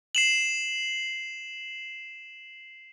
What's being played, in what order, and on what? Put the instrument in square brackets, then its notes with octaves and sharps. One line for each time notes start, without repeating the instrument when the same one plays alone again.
[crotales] C7 E7 F#7